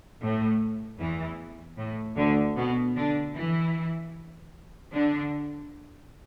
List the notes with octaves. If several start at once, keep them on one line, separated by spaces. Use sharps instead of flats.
A2 A3
E2 E3
A2
D2 D3
B2 B3
D3 D4
E3 E4
D3 D4